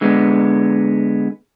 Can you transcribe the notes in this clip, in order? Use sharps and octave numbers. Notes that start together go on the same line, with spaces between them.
D3 G#3 B3